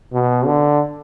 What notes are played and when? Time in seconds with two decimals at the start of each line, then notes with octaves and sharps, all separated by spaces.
0.12 B2
0.46 D3